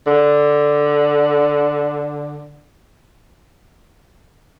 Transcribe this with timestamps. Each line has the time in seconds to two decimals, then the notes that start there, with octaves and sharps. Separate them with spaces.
0.07 D3